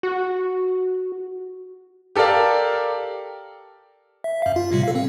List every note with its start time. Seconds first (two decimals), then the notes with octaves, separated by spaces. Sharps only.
0.03 F#4
2.16 G4 A4 A#4 D5 F5
4.24 E5
4.42 F#2 F5
4.56 F4
4.72 A2 C3 G3
4.83 A4 F5
4.95 C4